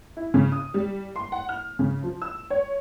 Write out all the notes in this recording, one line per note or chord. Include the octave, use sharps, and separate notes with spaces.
E4
C#3
D#6
G3
C6
F#5
F6
C#3
F3
E6
C#5